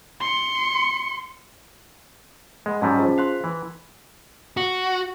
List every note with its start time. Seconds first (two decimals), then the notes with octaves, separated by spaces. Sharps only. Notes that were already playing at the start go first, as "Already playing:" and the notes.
0.20 C6 C#7
2.66 G#3 D#5 F#5 B5
2.82 G#2 F#3 G3 C#4 A5 B6
2.97 F4 G#4 C5
3.18 F5 C6 F#6 B6
3.44 E3
4.57 F#4